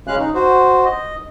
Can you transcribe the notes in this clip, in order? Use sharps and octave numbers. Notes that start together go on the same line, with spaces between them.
C#3 G#3 C#4 F5 F#6
D#4
F#4 C5
D#5